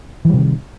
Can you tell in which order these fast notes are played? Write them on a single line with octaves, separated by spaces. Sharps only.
E3 G3 C3 D#3